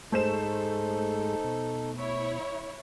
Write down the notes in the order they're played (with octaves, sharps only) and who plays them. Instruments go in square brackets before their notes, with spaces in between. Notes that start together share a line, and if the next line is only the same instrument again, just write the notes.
[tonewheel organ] G#2 G#3 G#4 [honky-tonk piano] A3 C5 E7 [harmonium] D#4 A4
[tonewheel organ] B2
[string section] E4 C#5